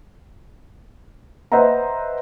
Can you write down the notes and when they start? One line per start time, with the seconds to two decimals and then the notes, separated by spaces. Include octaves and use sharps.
1.52 B4 C5 D#5 E5 F#5 A#5